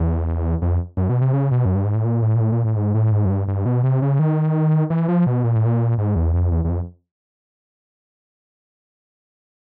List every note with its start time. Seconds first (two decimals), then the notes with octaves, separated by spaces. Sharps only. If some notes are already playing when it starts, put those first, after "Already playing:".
Already playing: E2
0.62 F2
0.97 F#2
1.09 B2
1.21 C3
1.33 C#3
1.51 B2
1.65 F#2
1.75 G2
1.85 G#2
1.95 A2
2.05 A#2
2.22 A2
2.35 A#2
2.40 A2
2.52 A#2
2.65 A2
2.76 G#2
2.95 A2
3.11 G#2
3.25 F#2
3.30 G2
3.48 G2
3.66 B2
3.83 C3
4.02 C#3
4.19 D#3
4.90 E3
5.08 F3
5.27 B2
5.44 A#2
5.55 A2
5.65 A#2
5.98 G#2
6.16 E2
6.33 F2
6.51 E2
6.65 E2
6.70 F2